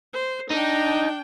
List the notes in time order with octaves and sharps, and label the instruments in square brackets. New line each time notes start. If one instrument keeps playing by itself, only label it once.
[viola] C5
[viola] D4 G5 [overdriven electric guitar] D#4